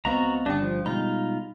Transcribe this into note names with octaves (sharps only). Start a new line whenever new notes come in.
C#2 B3 C4 F#4 D#5 F5 A#5 B5
G1 D3 G3 C#4 D4 G5
F3
B2 G3 G#3 D#4 F4 B5